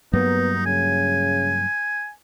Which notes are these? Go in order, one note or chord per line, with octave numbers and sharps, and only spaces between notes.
G2 F#3 A#3 B3 D#4
C#3 G#5